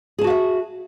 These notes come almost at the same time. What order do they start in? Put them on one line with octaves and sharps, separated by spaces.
G#4 A5 F#4 F5 E5